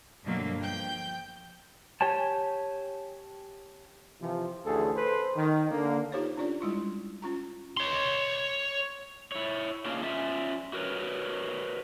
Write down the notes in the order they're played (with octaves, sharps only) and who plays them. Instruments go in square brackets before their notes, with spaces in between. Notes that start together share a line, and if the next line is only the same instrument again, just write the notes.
[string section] G2 B2 D3 F#3 A#3
F3 G5 G6
[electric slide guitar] G4 C#5 G#5 A5
[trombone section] C3 E3 F3
A1 D2 G#4 A4
A4 B4 C5
D#3
D3 A#3
[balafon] D#4 F4 G4 A4 C5 C#5
C#4 D4 F4 D5
G3 G#3 E4 F4
C#4 F4 A#5
[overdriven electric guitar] C#5 C6
[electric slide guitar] E4 C#5
A#3 C#4 D4 F4 G#4
C#4 F4 E5
F#4 A#4 B4 C#5